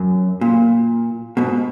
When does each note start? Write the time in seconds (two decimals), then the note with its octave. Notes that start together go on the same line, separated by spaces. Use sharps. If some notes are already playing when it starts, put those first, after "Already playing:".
Already playing: F#2
0.41 A#2
1.37 G#2 B2